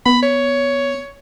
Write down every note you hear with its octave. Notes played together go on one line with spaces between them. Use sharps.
B3 B5
C#5